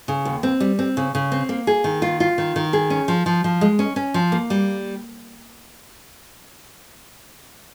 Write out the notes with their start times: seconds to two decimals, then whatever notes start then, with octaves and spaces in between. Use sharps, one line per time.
0.08 C#3
0.25 D#2
0.43 C4
0.60 G3
0.79 C4
0.97 C#3
1.15 C#3
1.32 C4
1.49 A#3
1.67 G#4
1.84 D#3
2.02 F4
2.20 F4
2.38 D#3
2.56 D#3
2.73 G#4
2.90 C#4
3.08 F3
3.26 F3
3.44 F3
3.61 G#3
3.79 C#4
3.96 C#4
4.14 F3
4.32 A#3
4.50 G3